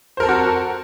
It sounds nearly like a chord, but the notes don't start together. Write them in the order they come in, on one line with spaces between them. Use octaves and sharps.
C5 A#4 A4 C4 F#4